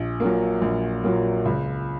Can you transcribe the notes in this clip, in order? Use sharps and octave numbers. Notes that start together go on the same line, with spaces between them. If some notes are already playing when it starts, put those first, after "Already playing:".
Already playing: A#1
A#2 F#3 A#3
A#1
A#2 F#3 A#3
C#2